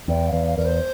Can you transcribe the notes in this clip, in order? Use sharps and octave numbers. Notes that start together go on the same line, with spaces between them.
E2 G5
F5
E2
F5
E2 A#4
C5